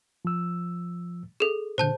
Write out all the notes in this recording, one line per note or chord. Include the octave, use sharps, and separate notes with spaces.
F3 E6
G#4 A4
A#2 D3 C5 A5 G6